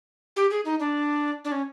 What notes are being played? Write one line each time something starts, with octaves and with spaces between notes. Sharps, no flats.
G4
G#4
D#4
D4
D4
C#4